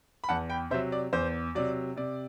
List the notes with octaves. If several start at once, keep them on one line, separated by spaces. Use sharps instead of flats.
B5
E2 F#5 A5
G5 B5
C3 F#3 C5 E5
D5
E2 C5
C3 F#3 D5
C3 D5